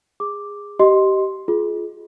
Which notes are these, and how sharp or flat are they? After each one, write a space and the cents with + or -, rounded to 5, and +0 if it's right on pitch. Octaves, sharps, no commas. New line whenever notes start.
G#4 -20 D6 +0
G4 -25 D#5 +0 C6 +0
F4 +0 G#4 +30